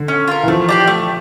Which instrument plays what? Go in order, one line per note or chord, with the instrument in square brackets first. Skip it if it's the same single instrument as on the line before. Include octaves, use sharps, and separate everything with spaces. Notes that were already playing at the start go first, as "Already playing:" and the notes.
Already playing: [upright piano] D3
[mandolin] C#4
F4 A#4
[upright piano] E3
[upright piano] F3 [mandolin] A3
[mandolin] D4 G4 D5
A3